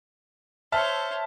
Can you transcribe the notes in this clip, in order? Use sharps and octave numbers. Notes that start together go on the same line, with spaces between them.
C5 C#5 E5 A5 F6